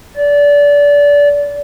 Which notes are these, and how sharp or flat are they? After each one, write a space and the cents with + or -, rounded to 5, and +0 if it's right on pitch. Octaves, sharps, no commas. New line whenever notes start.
D5 -25